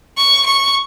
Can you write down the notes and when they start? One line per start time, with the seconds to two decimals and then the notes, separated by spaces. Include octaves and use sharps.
0.17 C#6
0.46 C#6